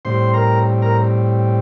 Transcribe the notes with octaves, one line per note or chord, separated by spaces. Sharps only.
A2 G3 C4 C5 C6
A#4 A#5
A#4 A#5